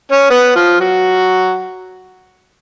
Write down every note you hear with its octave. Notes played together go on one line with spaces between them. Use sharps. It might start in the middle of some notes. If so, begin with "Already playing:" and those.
C#4 C#5
B3 B4
F3 F4
F#3 F#4